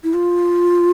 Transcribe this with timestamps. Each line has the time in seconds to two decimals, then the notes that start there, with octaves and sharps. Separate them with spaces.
0.04 E4
0.14 F4